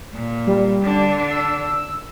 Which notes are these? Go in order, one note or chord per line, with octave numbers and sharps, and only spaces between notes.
A#2
G3
D3 D4
E6